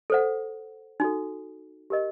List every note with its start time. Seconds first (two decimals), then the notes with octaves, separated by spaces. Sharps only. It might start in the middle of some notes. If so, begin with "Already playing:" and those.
0.10 A4 C5 F#5
1.00 D#4 F#4 A4
1.90 G4 A#4 D#5